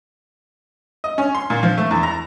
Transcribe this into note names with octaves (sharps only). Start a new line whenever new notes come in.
D#5
C#4
C6
A#2
F3
A3
E2
A#5